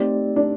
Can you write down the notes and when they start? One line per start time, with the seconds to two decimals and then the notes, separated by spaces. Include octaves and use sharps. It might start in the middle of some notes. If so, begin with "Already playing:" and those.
Already playing: A3 C4 D#4 G4 D5
0.36 D4